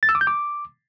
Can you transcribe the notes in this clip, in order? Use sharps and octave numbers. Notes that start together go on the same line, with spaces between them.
A6
E6
D6
G6
D6